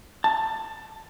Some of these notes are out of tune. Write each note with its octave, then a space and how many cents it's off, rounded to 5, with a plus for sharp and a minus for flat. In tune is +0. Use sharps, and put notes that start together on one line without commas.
A5 +15